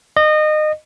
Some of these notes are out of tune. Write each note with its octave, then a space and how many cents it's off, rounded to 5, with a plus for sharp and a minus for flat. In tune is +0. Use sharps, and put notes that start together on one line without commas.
D#5 -25